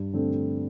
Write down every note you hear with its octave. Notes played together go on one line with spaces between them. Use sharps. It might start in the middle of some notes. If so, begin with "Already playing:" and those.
Already playing: G2
D3 A3 C4